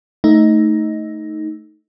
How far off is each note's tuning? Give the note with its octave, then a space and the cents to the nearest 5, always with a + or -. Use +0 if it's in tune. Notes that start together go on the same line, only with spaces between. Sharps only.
A3 +0 D#4 +10